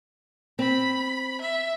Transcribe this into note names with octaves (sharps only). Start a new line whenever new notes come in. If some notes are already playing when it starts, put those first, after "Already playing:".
C4 B5
E5